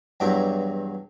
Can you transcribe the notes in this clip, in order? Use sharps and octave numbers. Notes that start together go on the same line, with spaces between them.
E2 G2 F#3 E4 D6